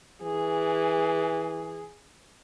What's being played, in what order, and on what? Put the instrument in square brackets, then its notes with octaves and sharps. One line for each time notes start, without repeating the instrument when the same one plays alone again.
[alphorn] E3 [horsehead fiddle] G#4